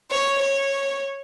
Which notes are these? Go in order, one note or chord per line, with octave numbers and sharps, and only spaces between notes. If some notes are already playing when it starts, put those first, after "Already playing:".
C#5
C#5